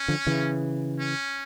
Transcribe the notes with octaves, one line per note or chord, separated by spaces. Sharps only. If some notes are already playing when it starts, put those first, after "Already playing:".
Already playing: C#4
D3 F3
C#3 E3
C#4